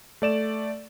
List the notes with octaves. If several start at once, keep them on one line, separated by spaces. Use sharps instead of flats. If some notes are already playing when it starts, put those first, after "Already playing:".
A3 D5 E7